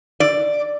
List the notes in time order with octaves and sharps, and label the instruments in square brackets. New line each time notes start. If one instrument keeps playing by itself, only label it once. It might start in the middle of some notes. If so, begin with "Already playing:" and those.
[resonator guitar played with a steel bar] D5